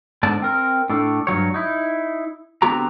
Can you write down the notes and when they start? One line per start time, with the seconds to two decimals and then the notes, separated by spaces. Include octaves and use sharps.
0.23 G#2 D3 B3 D5 A5
0.42 C4 A#4
0.90 A2 D4 A4
1.27 G2 B2 F#3 C#5
1.54 D#4 E4
2.62 D3 B3 C4 F#4 G4 A#5